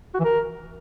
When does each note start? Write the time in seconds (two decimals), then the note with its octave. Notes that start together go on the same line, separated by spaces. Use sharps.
0.14 F#4
0.19 E3
0.25 A#4